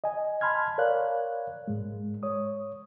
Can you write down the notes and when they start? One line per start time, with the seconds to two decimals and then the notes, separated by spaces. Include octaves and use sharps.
0.04 D#5 G#5
0.41 A5 B5 C6 F6 G#6
0.78 A#4 C#5 D5 F5 F#6
1.68 G#2 G#3
2.23 C#5 D#6